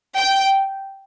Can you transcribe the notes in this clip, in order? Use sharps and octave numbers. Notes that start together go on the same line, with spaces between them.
G5